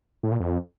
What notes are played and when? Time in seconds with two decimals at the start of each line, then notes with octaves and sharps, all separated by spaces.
0.23 A2
0.32 A#2
0.40 F2